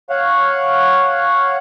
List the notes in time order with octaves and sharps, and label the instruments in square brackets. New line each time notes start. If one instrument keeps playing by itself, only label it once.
[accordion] C#5 F5 F#5